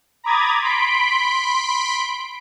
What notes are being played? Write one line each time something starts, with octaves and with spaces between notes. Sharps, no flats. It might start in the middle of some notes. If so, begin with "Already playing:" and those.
A#5 B5 D6 D#6 G#6 A6
B5 C6 B6 D7